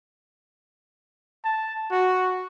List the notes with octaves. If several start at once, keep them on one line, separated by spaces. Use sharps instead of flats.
A5
F#4